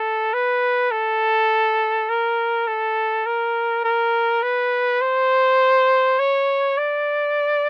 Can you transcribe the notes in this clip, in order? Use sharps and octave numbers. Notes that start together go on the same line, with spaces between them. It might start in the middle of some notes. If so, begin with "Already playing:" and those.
Already playing: A4
B4
A4
A#4
A4
A#4
A#4
B4
C5
C#5
D5